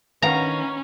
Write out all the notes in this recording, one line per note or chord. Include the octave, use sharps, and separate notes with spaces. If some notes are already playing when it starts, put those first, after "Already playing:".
D#3 C#4 B4 F5 F#5 A#5